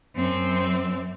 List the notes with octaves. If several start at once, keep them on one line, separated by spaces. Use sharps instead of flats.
F#2 C4